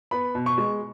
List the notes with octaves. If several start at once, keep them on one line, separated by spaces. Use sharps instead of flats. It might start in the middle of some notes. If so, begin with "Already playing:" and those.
B3 B5
B2
C#6
G#3